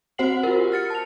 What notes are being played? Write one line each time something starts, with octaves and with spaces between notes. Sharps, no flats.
C4 F#4 C5 F#5 C7 F#7
F4 F#4 A#4
G4
F6 A6 C#7
A5 F7